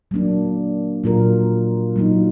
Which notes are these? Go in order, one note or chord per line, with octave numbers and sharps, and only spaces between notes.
F#3 A#3 D4
A#2 F#3 A#3 F4 A#4
F#3 A#3 D#4